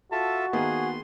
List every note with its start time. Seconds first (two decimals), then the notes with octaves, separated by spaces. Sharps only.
0.12 F4 F#4 A4 E5 A5
0.53 D#3 A#3 B3 G#4 C6